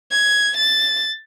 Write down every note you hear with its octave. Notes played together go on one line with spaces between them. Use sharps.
G#6
A6